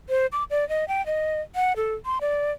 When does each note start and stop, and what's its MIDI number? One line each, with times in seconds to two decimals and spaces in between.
0.09 0.26 72
0.32 0.44 86
0.51 0.67 74
0.69 0.87 75
0.88 1.05 79
1.06 1.41 75
1.55 1.73 78
1.76 1.95 69
2.05 2.19 84
2.21 2.52 74